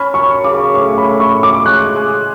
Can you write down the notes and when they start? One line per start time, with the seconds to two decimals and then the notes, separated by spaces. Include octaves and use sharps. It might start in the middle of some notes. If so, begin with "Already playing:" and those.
Already playing: C#4 B5
0.14 F#2 C#6
0.44 C#3 D6
0.74 A2 C#6
0.98 B5
1.05 A2
1.20 C#6
1.35 A2
1.43 D6
1.66 G#3 F#6
1.96 G#3